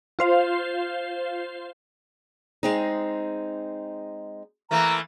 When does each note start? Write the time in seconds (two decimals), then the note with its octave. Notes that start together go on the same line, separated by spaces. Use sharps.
0.19 F4 C5 F5
2.63 G#3 C4 D#4
4.71 E3 A3 A#3 A#5